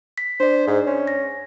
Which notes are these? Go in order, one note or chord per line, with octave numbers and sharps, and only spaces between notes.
B6
D4 C5 D5
G#2
C#4
A#6